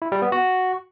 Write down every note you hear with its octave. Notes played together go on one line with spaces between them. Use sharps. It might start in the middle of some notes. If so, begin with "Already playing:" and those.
E4
G3
B3
F#4